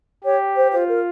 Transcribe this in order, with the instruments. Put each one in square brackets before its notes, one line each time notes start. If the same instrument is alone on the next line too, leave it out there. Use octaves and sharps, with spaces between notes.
[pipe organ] G4 [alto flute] C#5
[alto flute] C5
[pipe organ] F4 [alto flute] C5
[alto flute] A#4